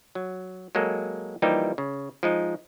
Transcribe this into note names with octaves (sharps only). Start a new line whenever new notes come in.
F#3
F#3 G#3 A#3 A4
E3 F3 G3 A#3 D#4 G4
C#3
F3 G#3 D#4